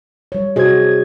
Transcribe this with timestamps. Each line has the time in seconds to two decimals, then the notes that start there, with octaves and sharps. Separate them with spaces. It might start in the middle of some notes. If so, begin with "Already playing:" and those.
0.32 G3 C#5
0.56 C3 F#4 G#4 C5 D#5 G#6